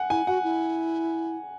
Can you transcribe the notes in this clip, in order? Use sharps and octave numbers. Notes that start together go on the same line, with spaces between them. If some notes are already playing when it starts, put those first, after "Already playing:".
Already playing: F#5 G#5
E4 G#5
F#4 F#5
E4